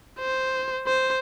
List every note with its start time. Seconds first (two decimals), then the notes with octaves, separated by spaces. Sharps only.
0.20 C5
0.87 C5